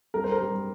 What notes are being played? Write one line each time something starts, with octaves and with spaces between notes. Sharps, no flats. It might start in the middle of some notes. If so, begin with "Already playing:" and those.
G3 A#4
C5
A#4
G3